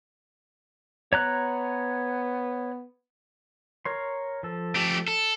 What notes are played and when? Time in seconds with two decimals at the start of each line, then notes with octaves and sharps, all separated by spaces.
1.13 B3 C#5 A#5 F#6
3.85 A#4 C#5 C6
4.43 F3 A4
4.76 A3 G4
5.08 A4